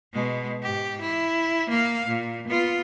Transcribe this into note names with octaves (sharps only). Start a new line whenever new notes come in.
B2 G#3
G#2 G4
E4
A#3 F5
A#2
B3 F4